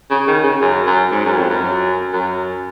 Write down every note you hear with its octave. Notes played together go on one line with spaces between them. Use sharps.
C#3
D#3
C#3
F#2
F#2
G#2
F#2
F2
F#2
F#2